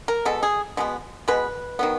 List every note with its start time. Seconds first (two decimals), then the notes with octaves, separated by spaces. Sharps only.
0.08 A#4
0.25 B2 G#3 B3 A4
0.43 G#4
0.77 B2 G#3 B3
1.28 B2 G#3 B3 B4
1.79 D#3 F#3 B3